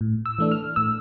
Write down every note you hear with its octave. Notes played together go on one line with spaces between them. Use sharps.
A2
E6
E3 A3 D4
F6
A2 E6